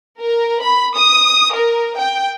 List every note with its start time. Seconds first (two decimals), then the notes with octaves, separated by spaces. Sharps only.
0.19 A#4
0.60 B5
0.96 D#6
1.54 A#4
1.97 G5